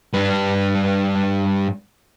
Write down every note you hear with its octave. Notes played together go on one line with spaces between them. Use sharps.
G2 B4